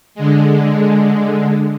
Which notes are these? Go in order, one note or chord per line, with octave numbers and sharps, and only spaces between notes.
D3 G#3